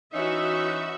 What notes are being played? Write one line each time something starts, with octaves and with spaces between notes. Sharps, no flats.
E3 C#4 D#4 F#4 E5